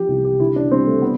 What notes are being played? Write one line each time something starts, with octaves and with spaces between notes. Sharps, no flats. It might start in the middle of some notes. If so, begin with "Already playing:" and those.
Already playing: F3 G4
C2
G4
D3 E4
D4
G3 C4
A3
B3